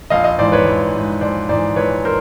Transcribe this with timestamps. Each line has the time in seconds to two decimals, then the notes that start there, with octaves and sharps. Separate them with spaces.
0.10 A#1 D#5 F5
0.24 D#5 F5
0.38 G#2 E3 C5 D5
0.52 B4 C#5
0.66 A#1
0.93 G#2 E3
1.21 A#1 C5 D5
1.49 G#2 E3 C5 D5
1.76 A#1 B4 C#5
2.05 A#4 C5